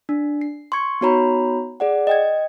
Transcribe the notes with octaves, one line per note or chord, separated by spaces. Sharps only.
D4
C7
C6 C#6 G#6 C#7
B3 D#4 F#4 C#5 A#5 B5
G#4 D5 F#5
D#5 G5 G#6